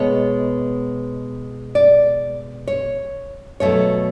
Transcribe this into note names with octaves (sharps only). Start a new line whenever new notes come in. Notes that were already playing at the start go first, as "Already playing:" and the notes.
Already playing: B2 G#3 B3 C#5
D5
C#5
B2 F#3 A3 C#5